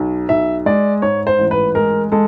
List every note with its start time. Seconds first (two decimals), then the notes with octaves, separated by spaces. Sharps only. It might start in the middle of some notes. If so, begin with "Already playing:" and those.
Already playing: B1
0.29 B1 E5
0.66 G#3 D5
1.02 G#2 C#5
1.27 C5
1.39 A1
1.51 B4
1.75 G#3 A#4
2.12 G#3 A4